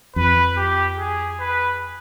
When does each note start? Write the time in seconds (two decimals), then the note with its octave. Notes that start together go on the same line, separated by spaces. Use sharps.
0.16 F2 B4
0.56 G4
0.98 G#4
1.40 B4